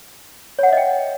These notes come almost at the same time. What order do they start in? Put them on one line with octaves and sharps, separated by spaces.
C#5 F#5 E5 D#5 G5